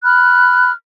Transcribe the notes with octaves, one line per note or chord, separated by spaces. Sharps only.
B5 F6 F#6